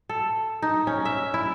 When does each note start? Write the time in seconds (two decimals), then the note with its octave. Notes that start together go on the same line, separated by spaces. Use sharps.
0.09 A4
0.62 D#4
0.87 C#4
1.05 E5
1.34 E4